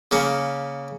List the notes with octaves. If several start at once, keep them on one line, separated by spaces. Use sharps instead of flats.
C#3 A#3 C#4